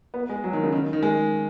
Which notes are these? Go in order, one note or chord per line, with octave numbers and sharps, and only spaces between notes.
B3
G#3
F#3
D#3
C#3
D#3
D#3
G#3